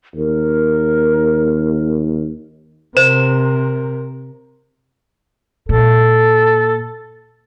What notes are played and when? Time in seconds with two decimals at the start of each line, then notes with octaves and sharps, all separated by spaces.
0.15 D#2 A#4
2.97 C3 A#4 C5 E7
5.69 A#2 A4